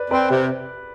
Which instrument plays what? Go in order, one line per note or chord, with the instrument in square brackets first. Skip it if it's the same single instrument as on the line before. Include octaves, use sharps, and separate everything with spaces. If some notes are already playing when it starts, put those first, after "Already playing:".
Already playing: [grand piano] B4 D5
[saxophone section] C4 [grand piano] B4 D5
[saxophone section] C3